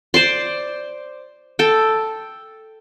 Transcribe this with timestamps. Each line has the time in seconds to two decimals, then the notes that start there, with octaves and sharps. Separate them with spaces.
0.14 C5 D5 C6
1.59 A4 G5